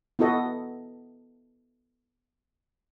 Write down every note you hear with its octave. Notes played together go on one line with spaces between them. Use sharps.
B3 E4 F#4 A4 D#5